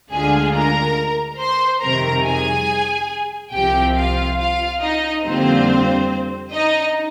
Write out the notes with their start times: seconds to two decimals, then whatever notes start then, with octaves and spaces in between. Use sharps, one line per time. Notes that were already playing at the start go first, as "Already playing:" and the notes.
0.11 D2 D3 G#3 D4 F4 G#4 G#5
0.54 A#4 A#5
1.39 C5 C6
1.82 F2 C3 D#3 G3 A#4 A#5
2.24 G#4 G#5
3.53 C2 C3 F3 C4 G4 G5
3.95 F4 F5
4.38 F4 F5
4.81 D#4 D#5
5.24 F2 D3 G3 A#3 C4 F4 C5
6.53 D#4 D#5